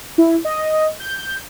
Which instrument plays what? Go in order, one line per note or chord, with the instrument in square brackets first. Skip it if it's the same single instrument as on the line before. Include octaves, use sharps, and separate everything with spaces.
[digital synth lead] E4
D#5
G6